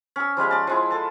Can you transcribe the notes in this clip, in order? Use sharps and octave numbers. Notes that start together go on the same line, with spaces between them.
C#4 E6
F3 G3 G#3 C#4
D5 A5
F3 G#3 E4
A4 A5